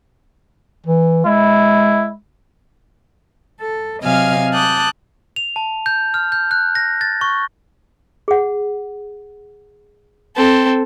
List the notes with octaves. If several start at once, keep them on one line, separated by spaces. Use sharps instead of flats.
E3
G#3 E4
A4
C3 F#3 D#5 F5 G#5 F6
A5 D6 D#6 F#6 G6
F7
A5
G6
F6
G6
F#6
A#6
A6
C#6
G#4 F#5
C4 A4